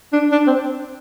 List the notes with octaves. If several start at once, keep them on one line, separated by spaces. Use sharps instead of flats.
D4
D4
C4